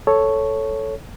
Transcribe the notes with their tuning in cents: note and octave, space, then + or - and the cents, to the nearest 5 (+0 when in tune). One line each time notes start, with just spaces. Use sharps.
A4 +0 C#5 +0